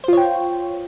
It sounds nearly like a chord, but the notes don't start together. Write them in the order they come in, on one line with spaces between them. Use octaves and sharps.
C5 F4 C#5 G5